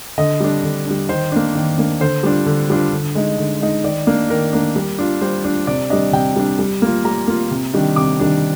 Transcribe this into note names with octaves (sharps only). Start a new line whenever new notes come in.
D3 D#5
G3 D4
D3
G3 D4
D#3 C5
A#3 D4
D#3
A#3 D4
D3 C5
G3 D4 F4
D3
G3 D4 F4
D3
G#3 D#4
D3
G#3 D#4
D#3 D5
A#3 D4
D#3 A#4
A#3 D4
G3
D4 F4
G3 C5
D4 F4
C3 D5
G3 D4 D#5
C3 G5
G3 D4
G3
A#3 F4
G3 A#5
A#3 F4
C3
D#3 G3 D4
C3 D6
D#3 G3 D4